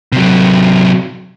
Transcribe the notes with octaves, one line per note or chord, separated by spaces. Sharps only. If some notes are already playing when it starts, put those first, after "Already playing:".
C3 F#3